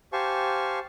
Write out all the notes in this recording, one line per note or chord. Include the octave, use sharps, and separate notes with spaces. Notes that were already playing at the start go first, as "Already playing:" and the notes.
G4 C5 F5 G#5 A5 C#6